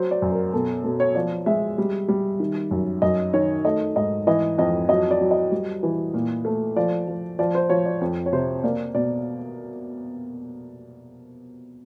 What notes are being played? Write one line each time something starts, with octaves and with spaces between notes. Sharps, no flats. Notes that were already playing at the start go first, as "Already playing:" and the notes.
Already playing: F#3 C5
D5
F#2
A#4
B2 A4
B2 A4
C#5
F3 D5
G#3 E5
G3
G3
D#3
F#2
F#2 D#5
D#3 C#5
A3 D#5
G#2 D#5
E3 D#5
F2 D#5
F#3 D#5
D5
F#3
D#5
G3
E3
A#2
A3
F3 D5
F3
F3 D5
C5
F3 C#5
D5
F2
C#5
C3 C5
A#3 D5
B2 D5